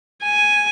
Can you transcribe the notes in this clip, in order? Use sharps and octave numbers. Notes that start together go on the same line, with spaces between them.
G#5